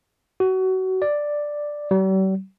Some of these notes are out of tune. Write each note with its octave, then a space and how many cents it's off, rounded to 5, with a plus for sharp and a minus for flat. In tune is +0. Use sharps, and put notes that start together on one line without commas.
F#4 +25
D5 +5
G3 -45